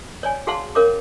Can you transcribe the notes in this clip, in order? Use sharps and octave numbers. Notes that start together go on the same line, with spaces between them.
C#5 D5 G#5
F#4 G#4 F5 F#5 A5 C6
C#4 A#4 C#5 F5 D6